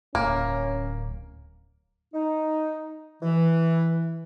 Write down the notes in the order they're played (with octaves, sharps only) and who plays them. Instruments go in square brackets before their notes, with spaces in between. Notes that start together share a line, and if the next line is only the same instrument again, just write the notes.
[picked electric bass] D1 [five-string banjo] A#3 [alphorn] C#4
[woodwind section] D#4
E3